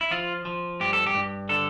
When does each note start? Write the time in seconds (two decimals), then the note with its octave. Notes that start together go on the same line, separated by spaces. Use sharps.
0.01 E4
0.11 F3 F4
0.45 F3
0.80 G2 G4
0.93 A4
1.07 G4
1.14 G2
1.49 D3 A4